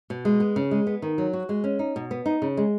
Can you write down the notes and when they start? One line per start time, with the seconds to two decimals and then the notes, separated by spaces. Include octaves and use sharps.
0.10 B2
0.25 G#3
0.40 B3
0.56 C#3
0.71 G#3
0.87 B3
1.02 D#3
1.18 F#3
1.33 F#4
1.49 G#3
1.64 C#4
1.79 D#4
1.96 B2
2.11 B3
2.26 D#4
2.42 C#3
2.57 G#3